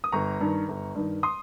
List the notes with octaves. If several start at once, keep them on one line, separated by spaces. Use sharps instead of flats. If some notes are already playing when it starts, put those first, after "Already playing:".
D#6
G1 A#5 C#6
G2 D#3
G1
G2 D#3
C6 D#6